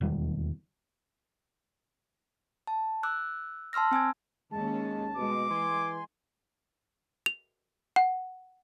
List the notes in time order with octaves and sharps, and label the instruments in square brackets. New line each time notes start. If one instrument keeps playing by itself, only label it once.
[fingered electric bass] E1 D#2 G3
[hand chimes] A5
D6 E6 F#6
A5 C6 E6 F6 A#6
C4 G#5 E6 G#6
[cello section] D#2 C#4 [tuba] G#3 [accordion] A5
[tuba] B2 [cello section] G#3 [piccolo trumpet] D6
[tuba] E3 [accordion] G#5 C6
[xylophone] F7
F#5